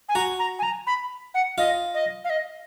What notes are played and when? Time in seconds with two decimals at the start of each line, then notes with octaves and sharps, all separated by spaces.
0.09 G#5
0.15 F#4 A#5
0.39 A#5
0.59 G#5
0.63 A#5
0.87 B5
1.34 F#5
1.58 F4 D#5
1.94 D#5
2.24 F5
2.30 D#5